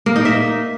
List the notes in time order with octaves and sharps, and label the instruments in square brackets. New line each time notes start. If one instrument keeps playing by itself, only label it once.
[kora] A#3
D#4
E5